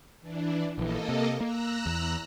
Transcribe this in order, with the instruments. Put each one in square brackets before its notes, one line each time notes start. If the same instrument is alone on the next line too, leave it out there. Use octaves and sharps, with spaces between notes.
[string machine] E3 D4
[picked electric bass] A#1 E3 [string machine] A#3 A4 D#5
[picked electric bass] C3
[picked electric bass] A#3 [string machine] A#5 E6 F#6
[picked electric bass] E2